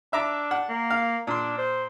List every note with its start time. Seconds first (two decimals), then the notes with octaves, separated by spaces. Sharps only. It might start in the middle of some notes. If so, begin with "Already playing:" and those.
0.13 D4 E5 A#5 D6
0.51 F#5
0.69 A#3
0.90 F5
1.27 A#2 D4 C6
1.58 C5